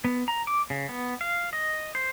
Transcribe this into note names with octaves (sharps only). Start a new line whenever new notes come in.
B3
A#5
D6
C#3
B3
F5
D#5
C5